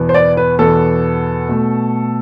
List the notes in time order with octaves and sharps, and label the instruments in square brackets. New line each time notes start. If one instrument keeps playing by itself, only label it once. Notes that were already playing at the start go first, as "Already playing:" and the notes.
Already playing: [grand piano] E2 B2 B3
C5
D5
B4
E2 B2 B3 A4
B2 A3